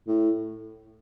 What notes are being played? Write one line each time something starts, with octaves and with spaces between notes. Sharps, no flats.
A2